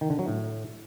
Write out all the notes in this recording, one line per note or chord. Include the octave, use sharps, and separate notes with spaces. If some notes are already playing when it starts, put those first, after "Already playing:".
D#3
D3
F#3
A2